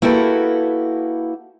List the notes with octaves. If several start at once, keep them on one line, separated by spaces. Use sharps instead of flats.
A#3 E4 F#4 G4 A4 B4